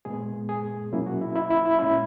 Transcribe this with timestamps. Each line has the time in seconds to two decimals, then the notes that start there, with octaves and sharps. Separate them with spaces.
0.05 A#2 G#3 B3 G#4
0.49 G#4
0.92 B2 F#3 A#3 C#4 E4
1.07 F#4
1.21 E4
1.36 E4
1.51 E4
1.65 E4
1.79 A#2 G#3 C#4 E4